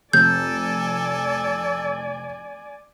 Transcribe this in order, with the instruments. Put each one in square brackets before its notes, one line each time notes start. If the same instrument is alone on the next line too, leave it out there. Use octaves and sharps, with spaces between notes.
[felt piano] F1 [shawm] A4 [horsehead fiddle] D5 G#5 [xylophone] G6